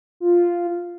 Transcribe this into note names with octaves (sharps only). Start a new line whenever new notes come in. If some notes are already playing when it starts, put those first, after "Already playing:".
F4